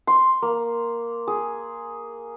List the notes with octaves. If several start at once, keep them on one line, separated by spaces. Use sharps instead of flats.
C6
A#3
G#4